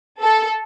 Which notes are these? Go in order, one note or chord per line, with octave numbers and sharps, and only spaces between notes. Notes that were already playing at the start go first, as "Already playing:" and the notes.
A4